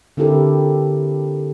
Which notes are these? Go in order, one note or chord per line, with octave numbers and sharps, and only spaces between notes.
D3 C4 E4 G4 A4 A#4